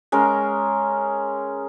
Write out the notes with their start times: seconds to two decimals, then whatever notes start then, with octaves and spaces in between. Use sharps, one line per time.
0.12 G#3 C#4 A#4